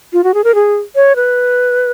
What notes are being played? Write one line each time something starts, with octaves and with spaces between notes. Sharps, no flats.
F4
F#4
G#4
A#4
G#4
C#5
B4